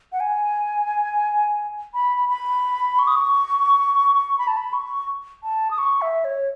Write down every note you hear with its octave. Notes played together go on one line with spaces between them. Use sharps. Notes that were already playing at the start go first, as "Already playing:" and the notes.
F#5
G#5
B5
B5
C#6
D#6
C#6
B5
A5
B5
C#6
A5
D#6
C#6
E5
C#5